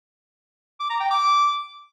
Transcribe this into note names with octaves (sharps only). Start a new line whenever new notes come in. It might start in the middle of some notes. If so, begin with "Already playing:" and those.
D6
A#5
G5
D6